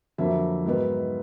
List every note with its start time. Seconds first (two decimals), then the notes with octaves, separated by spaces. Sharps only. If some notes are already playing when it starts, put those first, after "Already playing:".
0.18 F2 D3 F#3 A#3 E5
0.65 G#2 D#3 F#3 B3